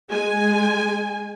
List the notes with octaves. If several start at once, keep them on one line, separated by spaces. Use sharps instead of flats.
G#3 G#5